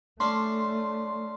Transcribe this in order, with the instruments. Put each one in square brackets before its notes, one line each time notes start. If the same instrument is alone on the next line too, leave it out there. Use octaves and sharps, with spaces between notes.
[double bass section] A3 [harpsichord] C#4 D4 [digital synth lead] C6